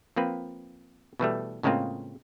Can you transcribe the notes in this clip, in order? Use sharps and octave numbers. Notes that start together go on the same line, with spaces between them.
F3 A#3 C4 B4
B2 E3 G3 A3
A2 C#3 G#3 A#3 C4 F4